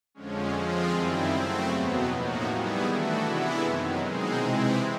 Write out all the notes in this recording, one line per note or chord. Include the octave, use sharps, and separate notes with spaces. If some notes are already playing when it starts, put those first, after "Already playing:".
F2 D3 F3 G#3 C#4
F3 G#3 C4 F4 G#4
F#2 D#3 G3 C4 E4
C#3 F#3 A3 C4
E2 B2 F#3 B3
A2 F3 A#3 D#4 F#4
D#3 G3 B3 E4 G#4
E3 A3 D4 F#4 A4
C3 E3 G#3 B3 E4
F#2 D#3 F#3
B2 G#3 C4 D#4 G#4
C3 E3 G#3 C4 E4